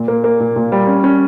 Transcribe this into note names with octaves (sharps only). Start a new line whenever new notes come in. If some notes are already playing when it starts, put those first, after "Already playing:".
Already playing: A#2
A#3
A#3
A#2
A#2
G3
C#4
C#4